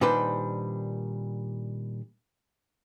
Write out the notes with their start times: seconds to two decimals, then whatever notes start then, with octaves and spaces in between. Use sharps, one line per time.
0.01 A#2 D#3 G3 D4 B4 C5